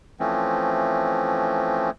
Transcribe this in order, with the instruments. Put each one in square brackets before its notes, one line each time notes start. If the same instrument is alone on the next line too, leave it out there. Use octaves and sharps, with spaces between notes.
[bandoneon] E3 F3 A3 C4 C#4